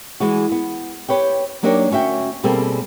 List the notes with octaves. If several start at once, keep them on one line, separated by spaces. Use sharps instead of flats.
E3 G#3 F#4
B3
G4 B4 C#5 G5
F#3 A#3 D4 D#4 G4 C#5
D2 C#4 F#4 E5 G5
B2 G3 A#3 C4 G#4 A4